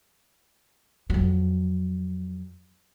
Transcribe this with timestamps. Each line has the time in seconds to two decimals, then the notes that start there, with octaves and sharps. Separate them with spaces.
1.10 F2 F#3